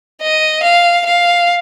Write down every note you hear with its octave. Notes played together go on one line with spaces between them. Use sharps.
D#5
F5
F5